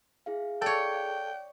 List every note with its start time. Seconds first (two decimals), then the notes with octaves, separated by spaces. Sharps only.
0.26 E4 G#4 F5
0.62 A4 C#5 D5 G5